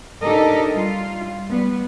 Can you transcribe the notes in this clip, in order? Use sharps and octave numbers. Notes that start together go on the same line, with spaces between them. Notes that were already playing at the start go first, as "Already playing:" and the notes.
D4 D#4 G4 A4 A#4 D#5
G3 F4
G3 B3